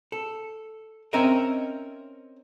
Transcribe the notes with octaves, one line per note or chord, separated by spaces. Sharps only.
A4
C4 C#4 D#4 A#4 D#5 E5